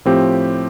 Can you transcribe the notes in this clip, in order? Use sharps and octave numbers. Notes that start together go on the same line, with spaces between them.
A2 F3 C4 G4